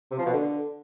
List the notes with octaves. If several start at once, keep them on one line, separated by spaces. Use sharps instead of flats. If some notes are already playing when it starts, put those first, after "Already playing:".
C3
F3
B2
D3